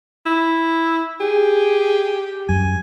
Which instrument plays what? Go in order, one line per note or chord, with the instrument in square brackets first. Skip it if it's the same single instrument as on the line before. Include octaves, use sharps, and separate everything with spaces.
[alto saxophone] E4
[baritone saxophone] G4 [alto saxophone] G#4
[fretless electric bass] F#2 [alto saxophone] G#5